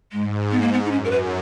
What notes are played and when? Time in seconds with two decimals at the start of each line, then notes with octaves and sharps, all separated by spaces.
0.12 G#2 G#3
0.51 B3
0.62 A#3
0.73 B3
0.85 D#4
0.91 F#2 C#4
1.05 A#4
1.11 B4